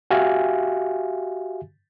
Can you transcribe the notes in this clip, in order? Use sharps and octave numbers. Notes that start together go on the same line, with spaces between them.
F#4 G4 E5 F5 G#5